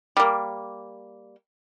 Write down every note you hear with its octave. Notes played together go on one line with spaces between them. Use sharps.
G3 A#3